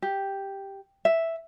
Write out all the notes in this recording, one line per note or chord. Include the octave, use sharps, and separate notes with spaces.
G4
E5